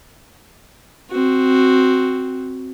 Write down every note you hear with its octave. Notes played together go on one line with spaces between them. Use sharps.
C4 F#4